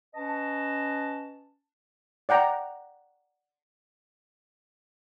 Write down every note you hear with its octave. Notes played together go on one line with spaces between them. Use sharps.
C#4 B4 D#5 A5
D5 F#5 G5 A#5